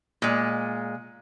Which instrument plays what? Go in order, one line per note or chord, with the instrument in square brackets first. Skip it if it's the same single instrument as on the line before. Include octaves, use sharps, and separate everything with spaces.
[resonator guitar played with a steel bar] A#2 G#3